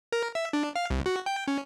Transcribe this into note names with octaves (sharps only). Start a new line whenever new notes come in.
A#4
E5
D4
F5
C2
F#4
G5
C#4